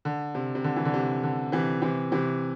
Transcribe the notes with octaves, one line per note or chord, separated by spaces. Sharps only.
D3
C3
C3
D3
E3
D3
C3
D3
C3 E3
C3 E3
C3 E3